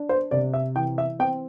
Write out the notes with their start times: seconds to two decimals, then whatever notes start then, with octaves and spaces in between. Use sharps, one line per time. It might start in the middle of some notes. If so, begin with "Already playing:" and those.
Already playing: D4
0.09 C5
0.31 C3 D5
0.54 E5
0.75 E3 G5
0.98 E5
1.19 C4 G5